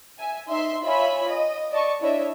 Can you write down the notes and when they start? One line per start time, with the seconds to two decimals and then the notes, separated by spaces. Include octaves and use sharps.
0.18 E5 G#5
0.49 D#4 E5 C6
0.84 F4 C#5 E5 G#5 B5
1.27 D#5
1.72 D5 D#5 A5 C#6
2.00 D4 E4 C#5 D#5 E5